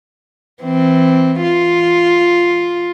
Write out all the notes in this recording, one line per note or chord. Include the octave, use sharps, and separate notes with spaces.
E3 C4
F4